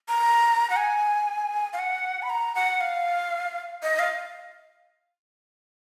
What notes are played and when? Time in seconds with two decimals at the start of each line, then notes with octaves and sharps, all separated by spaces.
0.09 A#5
0.70 F#5
0.76 G#5
1.73 F5
1.79 F#5
2.22 B5
2.30 A#5
2.55 F#5
2.81 F5
3.83 D#5
3.99 F5